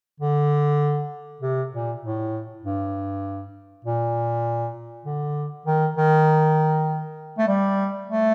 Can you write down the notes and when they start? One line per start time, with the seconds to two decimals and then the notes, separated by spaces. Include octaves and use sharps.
0.20 D3
1.41 C3
1.72 A#2
2.03 A2
2.63 G2
3.85 A#2
5.05 D3
5.66 D#3
5.97 D#3
7.38 A3
7.48 G3
8.09 A3